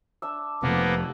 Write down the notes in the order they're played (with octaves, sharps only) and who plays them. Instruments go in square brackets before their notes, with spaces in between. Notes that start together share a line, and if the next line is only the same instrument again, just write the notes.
[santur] D4 E5 E6
[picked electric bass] F1 [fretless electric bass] C3 F3 [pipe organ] A#3 B3